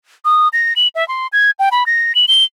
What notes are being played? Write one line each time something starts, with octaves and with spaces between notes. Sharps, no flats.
D#6
A#6
F#7
E5
C6
G#6
G5
B5
A#6
F#7
G7